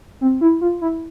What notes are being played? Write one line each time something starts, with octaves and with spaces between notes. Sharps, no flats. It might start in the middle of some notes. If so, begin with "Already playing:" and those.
C4
E4
F4
E4